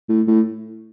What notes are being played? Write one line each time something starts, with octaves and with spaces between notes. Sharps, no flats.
A2
A2